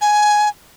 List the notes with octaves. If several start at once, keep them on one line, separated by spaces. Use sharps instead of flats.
G#5